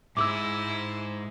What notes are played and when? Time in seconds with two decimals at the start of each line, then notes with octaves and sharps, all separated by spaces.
0.17 G#2 G#3 E4 D6 E6